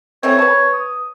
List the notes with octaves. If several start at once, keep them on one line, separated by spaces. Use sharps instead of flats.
E3 A3 C4 C#5
B4 A5
D#6